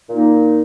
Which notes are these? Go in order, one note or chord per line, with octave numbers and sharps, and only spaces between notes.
A#2 A#3 D#4